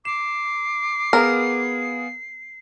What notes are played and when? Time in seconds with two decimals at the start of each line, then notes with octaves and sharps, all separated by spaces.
0.05 D6 C7 E7
1.13 B3 G#4 A#4 F5